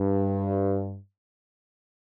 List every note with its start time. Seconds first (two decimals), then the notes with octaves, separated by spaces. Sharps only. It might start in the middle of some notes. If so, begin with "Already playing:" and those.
Already playing: G2